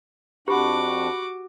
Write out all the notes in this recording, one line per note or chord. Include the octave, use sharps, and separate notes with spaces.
F2 D4 F#4 G4 F#5 B5 C#6 D6